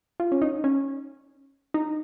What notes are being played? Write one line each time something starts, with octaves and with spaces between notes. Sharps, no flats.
F4
C#4
D#4
C#4
D#4